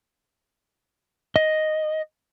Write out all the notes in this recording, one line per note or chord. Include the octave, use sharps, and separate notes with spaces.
D#5